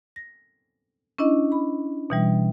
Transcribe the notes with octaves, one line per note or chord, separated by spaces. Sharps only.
A#6
C#4 D4 E4 D#5
B5
B2 E3 G3